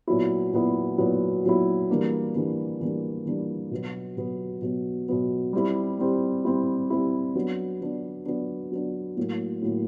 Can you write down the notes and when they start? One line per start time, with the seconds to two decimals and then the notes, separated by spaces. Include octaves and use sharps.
0.07 A#2 F#3 B3 E4
0.53 A#2 F#3 B3 E4
0.98 A#2 F#3 B3 E4
1.44 A#2 F#3 B3 E4
1.89 E3 G3 A#3 D4
2.35 E3 G3 A#3 D4
2.80 E3 G3 A#3 D4
3.26 E3 G3 A#3 D4
3.71 B2 F#3 B3
4.17 B2 F#3 B3
4.62 B2 F#3 B3
5.08 B2 F#3 B3
5.53 G3 C4 E4
5.99 G3 C4 E4
6.45 G3 C4 E4
6.90 G3 C4 E4
7.35 F#3 B3 D4
7.81 F#3 B3 D4
8.26 F#3 B3 D4
8.72 F#3 B3 D4
9.17 A2 F#3 A#3
9.62 A2 F#3 A#3